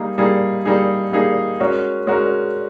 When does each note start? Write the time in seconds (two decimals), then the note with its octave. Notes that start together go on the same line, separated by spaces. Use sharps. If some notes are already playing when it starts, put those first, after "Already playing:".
Already playing: G3 A#3 D#4 G#4
0.18 G3 A#3 D#4 G#4
0.65 G3 A#3 D#4 G#4
1.12 G3 A#3 D#4 G#4
1.60 G#3 C#4 F#4 A#4
2.07 G#3 C#4 F#4 A#4